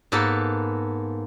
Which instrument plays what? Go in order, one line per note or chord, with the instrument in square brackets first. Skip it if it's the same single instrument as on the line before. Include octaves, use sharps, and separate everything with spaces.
[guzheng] G#2 A#3 B3 A4 B4 A#5